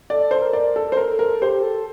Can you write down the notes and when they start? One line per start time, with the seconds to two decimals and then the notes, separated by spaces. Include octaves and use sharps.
0.10 A4 D5
0.31 C5
0.42 A#4
0.53 D5
0.76 A4
0.92 C5
0.97 A#4
1.09 A4
1.19 A#4
1.42 G4 C5
1.63 A4